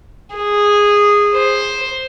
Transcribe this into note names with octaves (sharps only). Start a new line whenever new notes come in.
G#4
C5